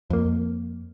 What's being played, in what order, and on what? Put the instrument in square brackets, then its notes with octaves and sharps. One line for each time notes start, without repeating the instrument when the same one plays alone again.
[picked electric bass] F2 A#3